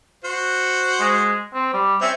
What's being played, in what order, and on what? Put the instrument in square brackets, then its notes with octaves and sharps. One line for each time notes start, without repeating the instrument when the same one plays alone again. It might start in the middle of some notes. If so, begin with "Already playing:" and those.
[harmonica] F#4 C5
[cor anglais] G#3
C4
G3
[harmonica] C4 C#4 [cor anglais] E5